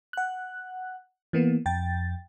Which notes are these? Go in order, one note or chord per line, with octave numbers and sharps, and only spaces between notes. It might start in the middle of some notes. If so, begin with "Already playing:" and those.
F#5 F#6
E3 A#3 B3
F2 G5 A6